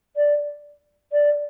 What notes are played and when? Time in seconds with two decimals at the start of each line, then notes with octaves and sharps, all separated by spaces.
0.16 D5
1.12 D5